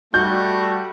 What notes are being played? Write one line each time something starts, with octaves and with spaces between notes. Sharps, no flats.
G3 A3 F#4 G6